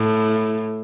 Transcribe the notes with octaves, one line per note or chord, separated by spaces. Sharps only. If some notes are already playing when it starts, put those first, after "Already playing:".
Already playing: A2